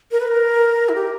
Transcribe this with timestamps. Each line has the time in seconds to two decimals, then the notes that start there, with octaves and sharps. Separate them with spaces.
0.11 A#4
0.20 B4
0.28 A#4
0.89 E4
0.95 G4